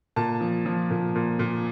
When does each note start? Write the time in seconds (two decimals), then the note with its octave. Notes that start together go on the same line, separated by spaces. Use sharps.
0.16 A#2 A5
0.41 F3
0.66 F3
0.91 A#2
1.15 A#2
1.39 A#2